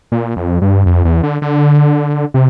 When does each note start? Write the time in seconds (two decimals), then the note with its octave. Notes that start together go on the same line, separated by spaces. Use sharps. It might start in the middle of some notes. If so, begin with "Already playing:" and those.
0.12 A#2
0.36 F2
0.62 G2
0.86 F2
1.05 E2
1.23 D3
1.42 D3
2.34 C3